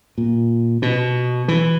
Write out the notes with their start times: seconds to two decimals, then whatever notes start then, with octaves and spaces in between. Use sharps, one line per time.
0.18 A#2
0.82 B2
1.48 E3